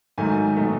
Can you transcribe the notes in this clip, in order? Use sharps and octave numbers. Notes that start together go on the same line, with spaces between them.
G#2 D#3 F#3 A3 G#5
B2 F#3 A3